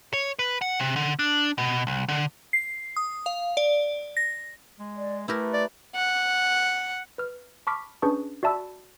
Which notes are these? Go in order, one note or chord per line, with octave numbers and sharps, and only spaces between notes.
C#5
B4
F#5
C3
D3
D4
B2
C2
D3
C7
D#6
F5
D5
A#6
G#3
D5
A3 E4 G4 A#4 B4
D5
F#5
B4 F6
A5 B5 C#6 D6 F6 B6
C#4 D4 G#4 B4 A5 C#6
F#4 D5 E5 A5 B5 E6